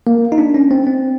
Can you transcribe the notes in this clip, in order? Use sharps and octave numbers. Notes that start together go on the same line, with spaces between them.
A#3
D#4
D4
C#4
C4
C4